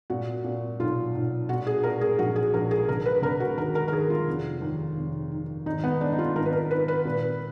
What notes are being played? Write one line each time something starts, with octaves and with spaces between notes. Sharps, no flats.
A#2 F#4
A#2
B1 F4
B1
A#2 F#4
G#4
A#2 A#4
G#4
A#1 F#4
G#4
A#1 A#4
G#4
D3 A#4
B4
D3 A#4
F#4
D#2 A#4
A#4
A#4
D#2 G#4
F4
F1
D#2
F1
D#3
G#1 D#4
B3
G#2 D4
D#4
F4
G#1 A#4
B4
A#4
D#3 B4
B4
A#2